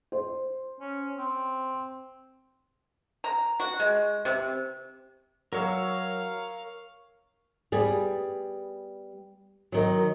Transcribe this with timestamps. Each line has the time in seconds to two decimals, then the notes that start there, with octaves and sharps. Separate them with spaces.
0.12 C5
0.80 C#4
1.18 C4
3.24 A#5
3.60 F#4
3.80 G#3
4.25 C3
5.53 F#3 A#4 C#5 F5 E6
7.72 G3 B3 G#4
9.72 D#3 F#3